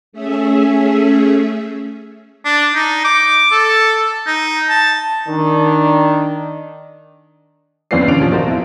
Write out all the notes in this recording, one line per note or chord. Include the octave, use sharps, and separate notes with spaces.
A3 C#4 G#4 E5
D4
D#4
D6
A4
D#4
A5
D#3 D4
E2 C4 C#4 B4 D5 C7
D#2 C3 C#4 D4 D7 F7
A#2 F3
D4 F4 F#4 A#4 C5 D#5
F2 E4